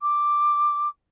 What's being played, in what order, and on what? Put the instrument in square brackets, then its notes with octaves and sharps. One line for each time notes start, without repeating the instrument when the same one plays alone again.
[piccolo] D6